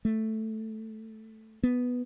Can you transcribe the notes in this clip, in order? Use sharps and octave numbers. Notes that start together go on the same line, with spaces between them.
A3
B3